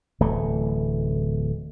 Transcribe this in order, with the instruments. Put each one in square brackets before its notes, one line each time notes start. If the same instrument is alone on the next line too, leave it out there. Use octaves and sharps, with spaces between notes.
[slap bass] D1 E3 A3